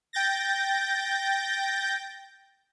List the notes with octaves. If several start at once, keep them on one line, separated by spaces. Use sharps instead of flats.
G5 G6 A6 A#6